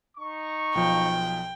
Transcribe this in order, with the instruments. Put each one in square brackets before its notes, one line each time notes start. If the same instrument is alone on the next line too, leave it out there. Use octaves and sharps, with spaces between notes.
[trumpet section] D#4 C#6
[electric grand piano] B1 F3 [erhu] G5